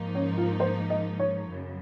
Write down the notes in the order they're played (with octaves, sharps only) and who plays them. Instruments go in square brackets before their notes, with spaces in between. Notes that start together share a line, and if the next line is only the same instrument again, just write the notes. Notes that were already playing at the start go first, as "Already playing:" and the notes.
Already playing: [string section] G#2 F3 A#3 D#4
[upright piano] C#4
F4
C5
D#5
C#5
[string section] F#2 C#3